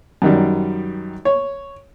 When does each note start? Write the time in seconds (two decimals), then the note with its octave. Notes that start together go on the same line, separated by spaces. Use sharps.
0.22 F#2 D#3 G3
1.25 C#5